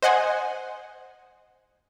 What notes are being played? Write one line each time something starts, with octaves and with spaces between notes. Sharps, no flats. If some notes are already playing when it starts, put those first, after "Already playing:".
C5 D#5 F#5 G#5